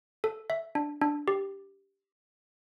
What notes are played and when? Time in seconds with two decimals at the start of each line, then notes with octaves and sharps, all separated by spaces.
0.24 A4
0.50 E5
0.75 D4
1.01 D4
1.28 G4